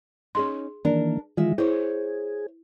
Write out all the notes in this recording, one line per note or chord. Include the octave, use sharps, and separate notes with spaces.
C#4 D#4 G#4 C6
D#3 E3 A#3 D4 A#4
D#3 E3 G#3 F4 E5
E4 G#4 C5 C#5